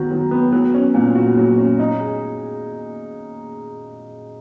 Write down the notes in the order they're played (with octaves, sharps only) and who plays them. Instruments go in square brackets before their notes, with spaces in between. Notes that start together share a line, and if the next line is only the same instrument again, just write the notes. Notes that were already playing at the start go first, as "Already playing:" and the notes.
Already playing: [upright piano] D#3 F#3 B3 F#4
F#3
B3
F#3
C#4
A#2
F#4
F#3
C#4
D#4
G#4